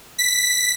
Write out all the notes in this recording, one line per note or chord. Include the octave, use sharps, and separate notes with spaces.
B6